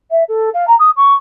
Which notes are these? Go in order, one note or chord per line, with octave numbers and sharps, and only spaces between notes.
E5
A4
F5
A#5
D#6
C#6